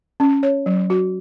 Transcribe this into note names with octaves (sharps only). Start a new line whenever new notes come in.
C#4
C#5
F#3
F#4